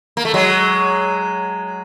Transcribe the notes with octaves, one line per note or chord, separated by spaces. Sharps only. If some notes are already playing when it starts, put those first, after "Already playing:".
A#3
A3
F#3 G#3